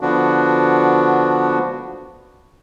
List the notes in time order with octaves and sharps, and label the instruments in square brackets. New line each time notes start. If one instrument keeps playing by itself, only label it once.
[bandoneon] D3 F3 B3 D4 F#4